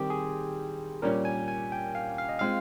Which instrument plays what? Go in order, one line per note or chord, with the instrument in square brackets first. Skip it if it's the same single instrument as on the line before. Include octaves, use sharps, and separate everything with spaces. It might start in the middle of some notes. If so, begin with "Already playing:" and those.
Already playing: [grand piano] D#3 G3 C4 [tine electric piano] G4
[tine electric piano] G#4
[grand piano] A#2 G3 C#4 [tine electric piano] A#4
[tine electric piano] G#5
G#5
G5
F5
F5
D#5
[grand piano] G#3 C4 F4 [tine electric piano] F5